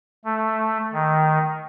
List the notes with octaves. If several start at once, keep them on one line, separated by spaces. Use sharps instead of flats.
A3
D#3